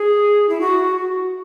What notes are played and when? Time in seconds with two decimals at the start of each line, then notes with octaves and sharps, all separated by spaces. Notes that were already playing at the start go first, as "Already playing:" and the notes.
Already playing: G#4
0.49 E4
0.61 F#4